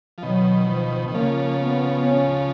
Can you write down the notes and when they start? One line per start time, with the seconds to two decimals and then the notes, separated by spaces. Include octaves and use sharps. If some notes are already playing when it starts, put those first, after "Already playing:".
0.18 F3
0.23 B2 D#3 F#3
0.69 F3
1.08 D#3
1.14 C#3 F3 A#3
1.60 B3
2.06 C#4